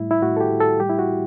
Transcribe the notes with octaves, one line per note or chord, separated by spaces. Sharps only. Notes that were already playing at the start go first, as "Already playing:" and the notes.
Already playing: A2 G3 E4
E4
A2 F#4
A4
G4
A2
A4
G3 G4
E4
F#4